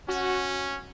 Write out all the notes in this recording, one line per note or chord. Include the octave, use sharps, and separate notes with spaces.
C#4 F#4